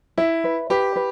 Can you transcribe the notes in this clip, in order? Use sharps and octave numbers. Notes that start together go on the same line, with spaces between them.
E4 E5
B4
G4 B4
B4